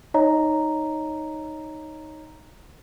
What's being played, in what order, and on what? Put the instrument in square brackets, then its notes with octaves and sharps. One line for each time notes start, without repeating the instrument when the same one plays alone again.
[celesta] D#4 C#5 D#5 A#5